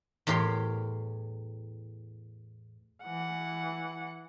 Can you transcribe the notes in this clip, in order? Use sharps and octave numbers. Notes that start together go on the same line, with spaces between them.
E2 A2 G4 A#4 C#5 C6
E3 F#5